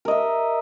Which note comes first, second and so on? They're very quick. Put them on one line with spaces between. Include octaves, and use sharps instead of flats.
A#4 D#5 E5